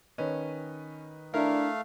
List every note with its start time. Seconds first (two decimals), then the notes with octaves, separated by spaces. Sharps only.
0.18 D#3 C#4 B4 D#5
1.34 A3 D4 E4 A#4 F5